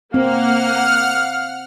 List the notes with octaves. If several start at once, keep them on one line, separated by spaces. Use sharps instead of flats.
A#3 C4 F5 F#5 F6